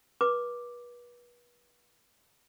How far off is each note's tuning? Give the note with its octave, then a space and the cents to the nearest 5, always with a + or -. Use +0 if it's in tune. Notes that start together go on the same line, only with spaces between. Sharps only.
B4 -35 D6 +0